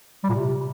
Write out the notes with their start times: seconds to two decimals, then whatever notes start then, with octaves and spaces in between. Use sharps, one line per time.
0.24 G3
0.29 A#2
0.35 C3